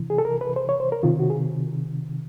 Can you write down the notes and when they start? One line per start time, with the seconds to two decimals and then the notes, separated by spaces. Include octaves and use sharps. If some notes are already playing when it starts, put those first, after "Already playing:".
Already playing: C3 E3
0.10 G#4
0.18 A4
0.25 A#4
0.41 B4
0.56 C5
0.69 C#5
0.80 C5
0.92 A#4
1.03 C3 D#3 F4
1.20 F#4
1.30 G#4